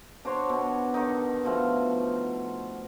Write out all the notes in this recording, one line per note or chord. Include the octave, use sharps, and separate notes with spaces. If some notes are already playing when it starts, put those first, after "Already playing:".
D4 F#4 C5 C#5
B2
D3 D#3 D#4
B2 F3 A3